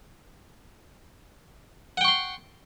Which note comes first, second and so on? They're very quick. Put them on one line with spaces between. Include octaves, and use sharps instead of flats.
F#5 G5 C#6 C6